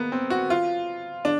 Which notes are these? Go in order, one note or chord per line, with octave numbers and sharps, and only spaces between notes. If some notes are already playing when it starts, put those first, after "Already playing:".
Already playing: A#3 B3
C4
F#4
F4
D4